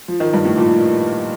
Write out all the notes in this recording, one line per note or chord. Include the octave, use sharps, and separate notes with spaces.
F3
D#3
G2
A2
A#2